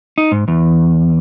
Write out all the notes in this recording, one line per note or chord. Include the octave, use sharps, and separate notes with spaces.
D#4
G#2
E2